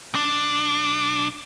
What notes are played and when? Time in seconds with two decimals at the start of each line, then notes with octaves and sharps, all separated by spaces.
0.14 B1 D4